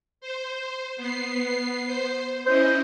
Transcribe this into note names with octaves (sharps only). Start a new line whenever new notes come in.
C5
B3 C7
C5
C#4 E4 C5 D#5